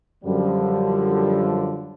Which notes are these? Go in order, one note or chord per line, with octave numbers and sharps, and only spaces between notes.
F#2 D3 F3 G3